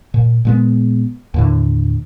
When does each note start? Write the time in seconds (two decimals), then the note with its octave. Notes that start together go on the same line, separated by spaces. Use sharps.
0.14 A#2
0.45 A#2 G#3 B3
1.34 D#2 A2 D3